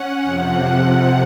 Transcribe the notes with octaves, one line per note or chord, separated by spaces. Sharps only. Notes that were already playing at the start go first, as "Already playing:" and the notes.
Already playing: C#4 F#5
F2 C3 F3